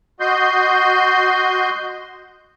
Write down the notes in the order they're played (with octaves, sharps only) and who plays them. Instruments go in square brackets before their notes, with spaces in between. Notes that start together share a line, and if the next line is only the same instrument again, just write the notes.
[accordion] F#4 D#5 C6 G6